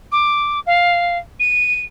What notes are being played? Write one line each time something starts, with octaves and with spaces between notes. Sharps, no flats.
D6
F5
D#7